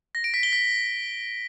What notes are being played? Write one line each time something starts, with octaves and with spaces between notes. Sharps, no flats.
A#6
D7
B6
G7
B6